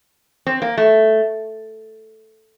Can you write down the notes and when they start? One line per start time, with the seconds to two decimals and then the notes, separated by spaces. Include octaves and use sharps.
0.47 C4
0.62 A#3
0.77 A3